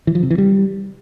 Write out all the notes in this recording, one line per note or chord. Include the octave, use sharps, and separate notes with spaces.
E3
F3
C3
E3
G3